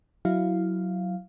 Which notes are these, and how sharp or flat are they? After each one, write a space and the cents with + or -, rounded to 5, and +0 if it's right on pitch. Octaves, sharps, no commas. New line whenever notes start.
F#3 +0 E4 +0 F5 +0